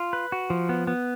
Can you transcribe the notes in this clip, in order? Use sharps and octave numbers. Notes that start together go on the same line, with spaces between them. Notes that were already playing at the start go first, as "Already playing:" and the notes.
Already playing: F4
B4
F#4
F3
B3
B3